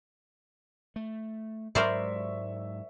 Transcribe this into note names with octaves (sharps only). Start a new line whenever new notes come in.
A3
G#2 F#3 G#3 A#4 C5 D5 E5 C#6